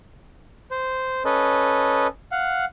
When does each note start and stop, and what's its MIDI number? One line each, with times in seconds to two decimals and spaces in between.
0.71 1.23 72
1.25 2.07 61
1.25 2.07 69
1.25 2.07 71
1.25 2.07 75
2.32 2.65 77
2.32 2.65 78